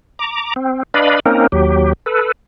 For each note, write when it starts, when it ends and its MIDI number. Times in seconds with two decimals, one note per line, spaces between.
0.19 0.54 82
0.19 0.54 86
0.56 0.83 60
0.94 1.20 62
0.94 1.20 71
0.94 1.20 74
0.94 1.20 75
0.94 1.20 77
0.94 1.20 83
1.26 1.47 58
1.26 1.47 60
1.26 1.47 61
1.26 1.47 63
1.26 1.47 70
1.52 1.93 39
1.52 1.93 54
1.52 1.93 67
2.06 2.32 69
2.06 2.32 71